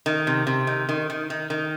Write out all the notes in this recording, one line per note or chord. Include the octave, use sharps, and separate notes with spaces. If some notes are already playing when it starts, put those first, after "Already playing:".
D#3
C3
C3
D#3
D#3
D#3
D#3
D#3